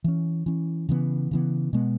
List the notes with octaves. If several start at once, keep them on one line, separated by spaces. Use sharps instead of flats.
E3 C#4
E3 C#4
C#3 E3 B3
C#3 E3 B3
B2 G#3 B3